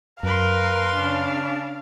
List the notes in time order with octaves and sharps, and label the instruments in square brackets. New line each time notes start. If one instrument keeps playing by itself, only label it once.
[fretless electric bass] F#2 [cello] A#4 [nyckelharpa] B4 C6 [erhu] F5
[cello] C#3 D4